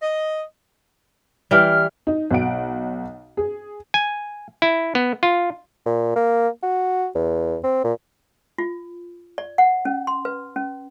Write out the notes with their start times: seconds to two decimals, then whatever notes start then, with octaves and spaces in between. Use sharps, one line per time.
0.02 D#5
1.51 E3 G3 F6
2.07 D#4
2.31 B1 F#5 D7
3.37 G#4
3.94 G#5
4.62 E4
4.95 B3
5.23 F4
5.86 A#2
6.16 A#3
6.63 F#4
7.15 E2
7.64 C4
7.84 A#2
8.58 F4
9.38 D5
9.58 F#5
9.85 C#4
10.07 C6
10.25 B4
10.56 C#4